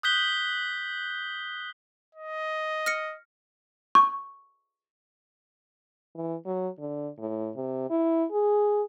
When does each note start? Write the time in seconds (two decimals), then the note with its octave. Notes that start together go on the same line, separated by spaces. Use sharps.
0.03 D#6 F#6 G6 B6 G7
2.15 D#5
2.86 F6 A#6 C#7
3.95 C#6
6.15 E3
6.46 F#3
6.79 D3
7.18 A2
7.56 C3
7.90 E4
8.31 G#4